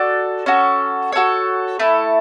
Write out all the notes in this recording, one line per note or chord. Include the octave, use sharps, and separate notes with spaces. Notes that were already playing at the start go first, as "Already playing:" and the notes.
Already playing: F#4 A4 D5
C#4 F#4 A4
F#4 A4 C#5
A3 E4 A4